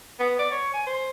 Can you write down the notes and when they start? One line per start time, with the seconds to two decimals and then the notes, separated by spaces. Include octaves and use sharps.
0.19 B3
0.39 D5
0.51 C#5
0.73 G#5
0.86 C5